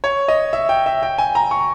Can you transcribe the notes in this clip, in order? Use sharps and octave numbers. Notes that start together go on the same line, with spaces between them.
C#5
D#5
E5
G5
E5
G5
G#5
A#5
C#6